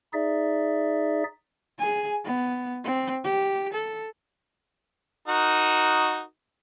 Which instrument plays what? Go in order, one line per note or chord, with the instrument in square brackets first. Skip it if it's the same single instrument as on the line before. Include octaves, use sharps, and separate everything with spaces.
[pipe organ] D#4 G#4 D5 E5
[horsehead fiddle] G#4 G#5
B3
C4
G4
A4
[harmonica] D#4 F#4 A#4